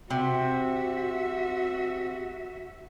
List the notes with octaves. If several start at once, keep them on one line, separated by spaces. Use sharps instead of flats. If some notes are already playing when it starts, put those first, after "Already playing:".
C3 F#4 E5